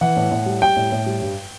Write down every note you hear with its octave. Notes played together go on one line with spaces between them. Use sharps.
E3 F#5
A2
A2
G3
G3 G5
A2
A2
G3
G2